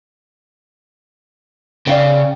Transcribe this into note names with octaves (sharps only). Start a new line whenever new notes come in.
C#3 D5 F5 G5